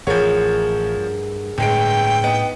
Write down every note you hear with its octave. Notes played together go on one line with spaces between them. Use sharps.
A1 F3 G#4 A#4 C#5 F#5
G2
G1 A2 G#3 A3 G5 D7
B3 D#4